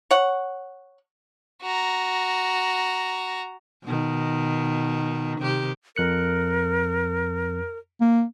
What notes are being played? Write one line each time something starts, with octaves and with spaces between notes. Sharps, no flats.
C#5 F#5
F#4 A#5
B2 D#3
C3 D#3 G4
F2 A#4 F#6 C#7
A#3